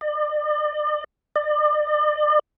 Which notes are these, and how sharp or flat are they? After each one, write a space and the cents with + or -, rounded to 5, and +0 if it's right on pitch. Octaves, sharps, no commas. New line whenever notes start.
D5 +40
D5 +40